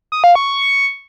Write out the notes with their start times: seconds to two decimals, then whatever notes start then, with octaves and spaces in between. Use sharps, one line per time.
0.12 D#6
0.24 F5
0.35 C#6